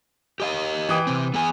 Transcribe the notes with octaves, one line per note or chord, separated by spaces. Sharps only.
G4 D#5 F5
E3 G5 D#6
C3 C4
B3 G#4 G#5